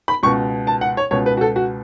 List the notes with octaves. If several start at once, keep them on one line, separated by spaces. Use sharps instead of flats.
B5
C#2 B2 C#6
A5
F#5
C#5
C#2 B2 C#5
B4
F#4
A4
F#4